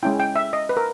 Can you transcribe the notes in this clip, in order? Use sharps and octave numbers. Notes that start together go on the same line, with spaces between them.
G#3 C#4 E4 G5
G5
E5
D#5
B4
A#4